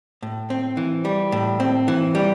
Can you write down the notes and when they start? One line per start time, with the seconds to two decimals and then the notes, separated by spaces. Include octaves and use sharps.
0.22 A2
0.50 C4
0.77 E3
1.05 G3
1.32 A2
1.60 C4
1.88 E3
2.15 G3